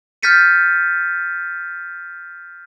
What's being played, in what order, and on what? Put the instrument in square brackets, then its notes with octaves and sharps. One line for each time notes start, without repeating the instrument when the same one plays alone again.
[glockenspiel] F6 G6 A6 B6 C#7 D#7